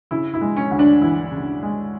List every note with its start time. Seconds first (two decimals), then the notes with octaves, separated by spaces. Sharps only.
0.11 C#3 E4
0.34 E4
0.41 G#3
0.57 C#4
0.71 D2
0.79 D4
1.02 E3 E4
1.32 C#3
1.63 G#3